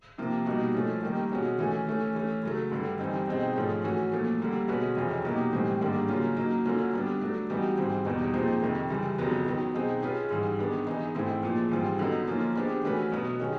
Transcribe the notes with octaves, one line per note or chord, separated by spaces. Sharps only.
C3 F3 A#3
B2 G3 A#3 D#4 F#4
F3 A3 C#4
D#3 G3 A#3 D#4
B2 G#3 C#4 F#4
E3 A3 C#4
E3 A3 C#4
E3 A3 C#4
C#3 F#3 A3
G2 D3 G3
E3 G3 C4 D#4
B2 G#3 C4 D#4
G#2 F3 A3 C#4
E3 A3 C#4 F#4
A#2 F3 A3
D3 G3 A#3
B2 G#3 C#4 F#4 B4
F2 C3 E3 G#3 C#4
B2 F#3 A#3 D#4 G4
A2 E3 G3 C4
G#2 D#3 G3 A#3 D4
C#3 F#3 A#3 C#4 F4
F#3 A#3 D#4
D3 F#3 A#3 C#4 F4
G3 B3 D4
F#3 A3 D4
E3 G3 B3 D#4 F#4
G#2 E3 G3 C4
E2 B2 G3 B3 D#4
A#2 F3 G#3 C4 D#4
F2 C3 D#3
F#2 C#3 E3 G3
F2 C#3 F#3 B3
D#3 F#3 B3
B2 G#3 C4 D#4 G#4
G#3 C#4 F4 G#4 B4
G#2 E3 G3
D#3 G#3 B3 D4
E3 G#3 B3 D#4
G#2 E3 A3 C4 E4
A#2 F3 G#3
G#2 E3 G3 C4 F4
D3 F#3 B3 D#4
F3 A#3 C#4 F4
G#3 B3 D4 G4 C5
E3 A3 C#4 F#4 B4
B2 F#3 B3
D#3 G#3 C#4